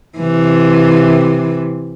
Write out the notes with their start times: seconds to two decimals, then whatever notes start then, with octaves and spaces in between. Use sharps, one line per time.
0.18 C3 E3